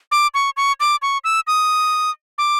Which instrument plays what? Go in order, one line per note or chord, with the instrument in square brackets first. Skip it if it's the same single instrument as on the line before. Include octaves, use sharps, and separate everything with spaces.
[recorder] D6
C#6
C#6
D6
C#6
E6
D#6
D6